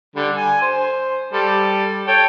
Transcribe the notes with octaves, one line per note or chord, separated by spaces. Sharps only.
D3 G3
G#5
C5
G3 A4
A4 C#5 G5